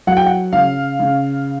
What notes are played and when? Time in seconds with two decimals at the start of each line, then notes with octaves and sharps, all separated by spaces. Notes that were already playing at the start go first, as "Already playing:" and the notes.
0.07 F#3 F#5
0.17 G5
0.26 F#5
0.53 C#3 F5
1.00 C#3